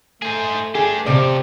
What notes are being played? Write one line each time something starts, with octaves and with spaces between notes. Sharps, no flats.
A3 G#4 C5
D4 G4 G#4
F2 C3 D5